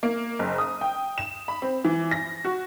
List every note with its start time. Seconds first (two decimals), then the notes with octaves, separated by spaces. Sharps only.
0.03 A#3
0.39 F#1
0.58 D#6
0.81 G5
1.18 E7
1.48 B5
1.62 C4
1.85 E3
2.11 A#6
2.45 F#4